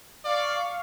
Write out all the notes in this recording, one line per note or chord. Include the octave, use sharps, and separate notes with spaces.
D5 F5 C#6